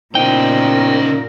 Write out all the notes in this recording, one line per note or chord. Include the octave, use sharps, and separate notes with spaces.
A#2 C#3 B3 D#4 E4 A#4 C5 G5